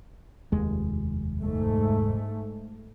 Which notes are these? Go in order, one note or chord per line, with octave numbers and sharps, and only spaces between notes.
F1 D#2 G#3
G#2 A3